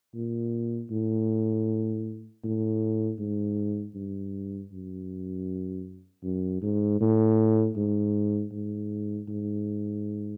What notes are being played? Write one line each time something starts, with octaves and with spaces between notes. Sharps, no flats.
A#2
A2
A2
G#2
G2
F#2
F#2
G#2
A2
G#2
G#2
G#2